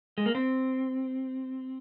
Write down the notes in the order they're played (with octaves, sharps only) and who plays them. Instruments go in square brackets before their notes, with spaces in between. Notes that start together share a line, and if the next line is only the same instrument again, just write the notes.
[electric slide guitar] G#3
A#3
C4